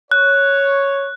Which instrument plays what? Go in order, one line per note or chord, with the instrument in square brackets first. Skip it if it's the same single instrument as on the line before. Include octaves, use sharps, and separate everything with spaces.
[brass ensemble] C#5 [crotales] F#6